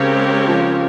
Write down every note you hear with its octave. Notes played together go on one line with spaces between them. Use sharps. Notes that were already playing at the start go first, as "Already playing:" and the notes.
Already playing: C#3 G#3 C4 G4 A#4 C#5
F3